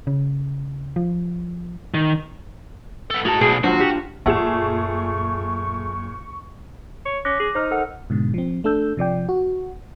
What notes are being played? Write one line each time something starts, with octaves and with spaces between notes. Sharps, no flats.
C#3
F3
D#3
B3 A4
A2 F#4 G#4 A5 A#5
B1 B2 G#4
D#2 F#3 D4 F4 F#4 C5
G4
F#2 A#2 A3 G#4 F#5 C#6 E7
C#5
C#4 D6 F#6 A#6
G#4
D#4 C5 F6
A4 A#4 F#5
G#2 B2 D3
F3 C4
A3 D4 A4 E6 G6
C3 F3 D5 G5
F#4